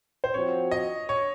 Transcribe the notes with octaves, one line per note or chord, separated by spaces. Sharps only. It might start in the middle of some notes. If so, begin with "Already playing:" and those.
C5
F3 C4 F#4 C#5
D#5
C#5